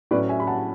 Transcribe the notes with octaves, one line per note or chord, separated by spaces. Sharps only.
A2 F#3 C#4 B4 D5
E5 G#5
B5
F#5 A5